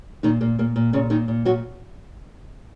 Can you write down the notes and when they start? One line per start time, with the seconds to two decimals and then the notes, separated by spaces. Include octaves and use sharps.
0.23 A#2 D#3 D#4
0.41 A#2 A#3
0.59 A#2 A#3
0.76 A#2
0.93 A#2 C#3 C#4
1.10 A#2 D#3 D#4
1.28 A#2
1.45 A#2 F#3 F#4